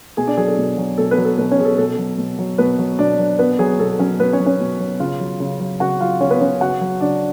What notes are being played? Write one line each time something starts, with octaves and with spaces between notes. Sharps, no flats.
B2 G#4 G#5
D4 D5
F#3 G#4
A4
B2
F#3
B2 A4
B3 B4
F#3
A4
B2 B3 B4
C#4 C#5
F#3 G#4
A4
B2 A4
F#3
B2
F#3
B2 B3 B4
F#3
B2 D4 D5
F#3
B2 B3 B4
F#3 G#4
B2 A4
F#3 C#4 C#5
B2 B3 B4
C#4 C#5
F#3
C#4 C#5
B2
F#3
C#3 F4 F5
F#3
C#3
F#3
C#3 F#4 F#5
F#3 F4 F5
C#3 C#4 C#5
B3 B4
F#3 C#4 C#5
C#3 F#4 F#5
F#3
C#3 D4 D5